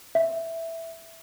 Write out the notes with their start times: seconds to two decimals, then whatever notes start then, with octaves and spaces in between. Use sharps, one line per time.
0.15 E5